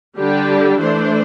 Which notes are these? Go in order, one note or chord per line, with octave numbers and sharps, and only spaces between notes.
D3 G3 D4 G4
E3 A3 D4 C5